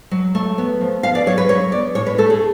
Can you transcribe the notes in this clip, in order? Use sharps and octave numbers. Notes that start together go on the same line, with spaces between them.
F#3
A3
B3
F3
B3 F5
D5
F#3 C#5
B4
F#3 C#5
B3 D5
A2 C#5
B4
A3 A4
G#4